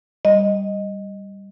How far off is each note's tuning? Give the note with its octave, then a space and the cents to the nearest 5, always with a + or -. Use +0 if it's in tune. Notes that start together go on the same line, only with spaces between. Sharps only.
G3 +0 D#5 +0